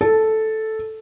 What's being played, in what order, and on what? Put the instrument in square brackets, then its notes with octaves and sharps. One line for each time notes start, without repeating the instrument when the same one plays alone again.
[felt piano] A4